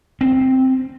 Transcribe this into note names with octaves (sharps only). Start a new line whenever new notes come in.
C4